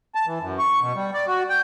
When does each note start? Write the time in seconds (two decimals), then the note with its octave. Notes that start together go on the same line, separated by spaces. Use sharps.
0.15 A5
0.27 E3
0.40 F#2
0.59 C#6
0.81 B2
0.95 G3
1.14 D5
1.27 F#4
1.50 G5